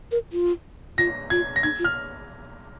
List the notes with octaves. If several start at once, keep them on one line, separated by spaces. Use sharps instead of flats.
A#4
F4
F4 A#6
F4 G#6
A#6
D#4 G#6
F4
F6